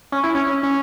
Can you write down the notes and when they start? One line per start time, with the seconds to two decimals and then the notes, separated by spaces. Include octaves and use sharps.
0.12 C#4
0.24 E4
0.35 C#4
0.47 C#4
0.63 C#4